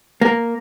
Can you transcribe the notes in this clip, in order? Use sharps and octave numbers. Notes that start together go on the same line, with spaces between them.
A#3